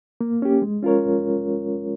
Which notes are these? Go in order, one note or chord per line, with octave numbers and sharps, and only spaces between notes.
A#3
C#4 G4
G#3
C#4 F4 A#4 C#5